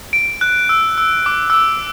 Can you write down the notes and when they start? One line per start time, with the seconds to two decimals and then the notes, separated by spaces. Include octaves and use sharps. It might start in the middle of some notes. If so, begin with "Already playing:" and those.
0.13 D7
0.41 F#6
0.69 E6
0.98 E6
1.26 D6
1.50 E6
1.54 D6